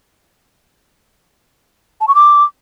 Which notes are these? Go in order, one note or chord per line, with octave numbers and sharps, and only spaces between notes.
A5
C#6
D6